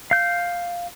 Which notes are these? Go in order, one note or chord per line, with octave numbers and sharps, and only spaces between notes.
F5 G6